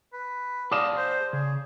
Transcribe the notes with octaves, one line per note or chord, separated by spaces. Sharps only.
B4
G#4 D5 F5 A5 D6 D#6 E7
C5
C#3 G#4